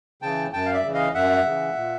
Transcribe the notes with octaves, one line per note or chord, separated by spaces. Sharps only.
C#3 E3 G5 A5
F#2 G5 A5
F5
D5 E5
C#3 E3
D#5 F5
F#2 E5 F#5
C#3 E3
A#2